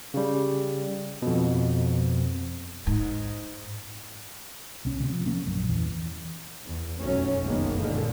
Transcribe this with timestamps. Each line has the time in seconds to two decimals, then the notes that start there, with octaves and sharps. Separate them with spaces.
0.14 C#3 G3
1.22 F2 B2
2.87 G#2
4.85 C2 C#4
4.99 D2 C3
5.12 F3
5.26 F3 A#3 C#4
5.45 A#1 F#2
5.68 E2 E3
6.65 E2
6.98 F1 B1 F#2 F#3 A3 C#4
7.43 F#1 C2 D#3 G#3 A#3 B3
7.79 A#2 D3 D#3 G#3 A#3